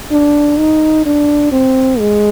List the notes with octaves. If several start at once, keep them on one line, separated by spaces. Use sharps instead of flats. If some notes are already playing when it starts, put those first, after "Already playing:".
D4
D#4
D4
C4
G#3